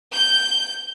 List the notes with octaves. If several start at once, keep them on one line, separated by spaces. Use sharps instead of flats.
G6